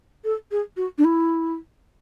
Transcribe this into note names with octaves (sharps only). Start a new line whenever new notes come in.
A4
G#4
F#4
D4
E4